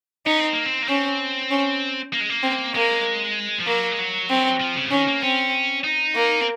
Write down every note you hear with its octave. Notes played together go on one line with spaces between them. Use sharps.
C#4 D#4
C4
A#3
C4
A#3
C4 C#4
C#4
A#3
G#3
A#3
C4
G#3 A#3
F3
F#3 A#3
G#3
F#3
C4
F3
C#3
F3
D#3 C#4
A#3
C4 C#4
D#4
A#3
C4